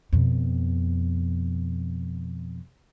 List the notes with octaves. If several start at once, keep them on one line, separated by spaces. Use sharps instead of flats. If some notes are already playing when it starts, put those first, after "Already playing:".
F2 B2